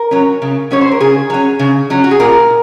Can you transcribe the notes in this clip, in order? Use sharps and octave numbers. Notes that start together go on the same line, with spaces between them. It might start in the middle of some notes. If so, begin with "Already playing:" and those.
Already playing: A#4
F#3 C#4
C#3
F#3 C#4 C#5
C5
A#4
C#3 G#4
F#3 C#4
C#3
F#3 C#4
F#4
G#4
A#2 A#4